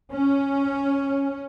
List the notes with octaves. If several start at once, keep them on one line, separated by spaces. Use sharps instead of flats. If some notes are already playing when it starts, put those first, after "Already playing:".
C#4